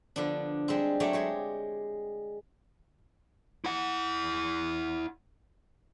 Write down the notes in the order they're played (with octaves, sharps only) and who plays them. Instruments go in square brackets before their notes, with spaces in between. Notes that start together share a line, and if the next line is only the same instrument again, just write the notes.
[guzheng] D3 F3 B3 D4
G3 G#3 C4
F#3 A3 G4 C#5 D5
G#3 G4 C#5
[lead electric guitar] E4 F#5